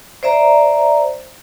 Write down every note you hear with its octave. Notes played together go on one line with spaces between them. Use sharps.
C5 D5 E5 A#5